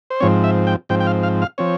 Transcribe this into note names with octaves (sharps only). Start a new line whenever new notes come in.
C5
G#2 F3 C4 C#5
E5
G5
G#2 F3 C4 G5
G5
F5
F5
F5
F3 C4 C#5